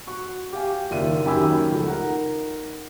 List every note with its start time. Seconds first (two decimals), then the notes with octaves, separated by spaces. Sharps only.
0.07 F#4 C#6
0.53 G4 F5 G#5
0.91 F#1 D#2 F4 D5 E5 D#7
1.26 F#2 D#3 G4 G#5 B5 E6
1.71 C#2 F3 A3
1.86 D#4 A#4 F#5